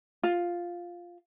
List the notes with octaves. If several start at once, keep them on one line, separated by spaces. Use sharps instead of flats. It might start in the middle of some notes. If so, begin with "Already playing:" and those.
F4